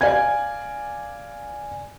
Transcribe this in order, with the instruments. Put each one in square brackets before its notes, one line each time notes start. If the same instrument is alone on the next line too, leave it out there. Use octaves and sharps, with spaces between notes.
[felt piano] D5 F5 G#5 G#6